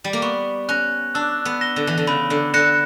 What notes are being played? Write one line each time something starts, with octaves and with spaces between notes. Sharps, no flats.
G3
A#3
B3 C#6
C#4 F#6 A#6
D4 E6
B3
A#6 E7 G7
D3
E3
D3
C#3 B5
D3
D3 F#6 A#6 C#7 E7